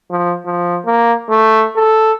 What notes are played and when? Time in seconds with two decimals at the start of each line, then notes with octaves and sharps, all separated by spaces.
0.11 F3
0.46 F3
0.86 A#3
1.30 A3
1.76 A4